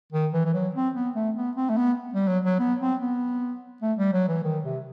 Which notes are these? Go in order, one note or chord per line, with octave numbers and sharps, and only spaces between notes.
D#3
E3
E3
F#3
C4
B3
A3
B3
C4
A3
B3
G3
F#3
F#3
B3
C4
B3
A3
G3
F#3
E3
D#3
C3